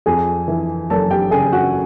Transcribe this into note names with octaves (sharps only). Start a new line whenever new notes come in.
F2 G#4 G#5
E3
F#1 A4 A5
G4 G5
C#3 G#4 G#5
F#4 F#5